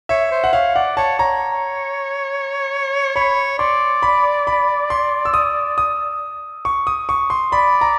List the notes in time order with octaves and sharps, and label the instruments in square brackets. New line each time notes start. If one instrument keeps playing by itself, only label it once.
[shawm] C#5 [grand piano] E5
[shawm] C5
[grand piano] F#5
[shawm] C#5 [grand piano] F5
[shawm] D5 [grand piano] F#5
[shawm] C#5 [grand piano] A5
[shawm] C#5 [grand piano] A#5
[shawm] C#5 [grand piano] B5
[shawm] D5 [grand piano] C6
[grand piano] B5
B5
C6
E6
D#6
D#6
C#6
D#6
C#6
C6
[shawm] D5 [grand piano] B5
[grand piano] A#5